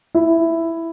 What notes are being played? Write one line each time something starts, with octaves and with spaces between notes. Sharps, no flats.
E4